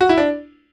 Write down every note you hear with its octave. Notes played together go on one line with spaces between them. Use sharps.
F#4
E4
D4